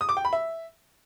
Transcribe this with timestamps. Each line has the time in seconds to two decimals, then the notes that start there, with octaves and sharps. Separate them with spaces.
0.01 D#6
0.09 D6
0.17 G5
0.25 B5
0.33 E5